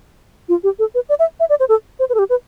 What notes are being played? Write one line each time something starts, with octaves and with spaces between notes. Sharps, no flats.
F4
G4
A4
B4
D5
E5
E5
D5
C5
A4
C5
B4
A4
G4
B4